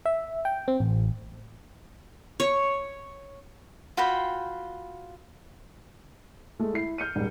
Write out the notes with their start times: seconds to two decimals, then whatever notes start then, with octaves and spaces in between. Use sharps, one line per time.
0.06 E5
0.45 G5
0.68 C4
0.80 A1
2.40 C#5
3.97 F4 F#4 G5 B5
6.59 G#3 A3
6.73 E4 C7
6.98 F6 G6 C#7 D#7
7.15 D#1 G#2 G3